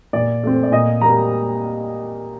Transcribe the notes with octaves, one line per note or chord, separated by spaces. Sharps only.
A#2 D5
A3 C4
D5
A#2 D#5
G3 A#3 A#5